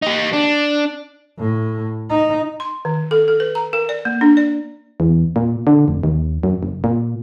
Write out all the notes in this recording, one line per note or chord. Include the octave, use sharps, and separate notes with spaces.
D#4 G4
D4
A2
D#4
C6
D#3
A4
A4
B4
A#5
A#4
D5
A#3
D4
D5
E2
A#2
D3
F1
D#2
F#2
F#1
A#2